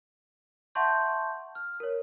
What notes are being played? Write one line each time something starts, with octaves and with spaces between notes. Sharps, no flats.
E5 F#5 A5 C6 C#6 G6
F6
A#4 C#5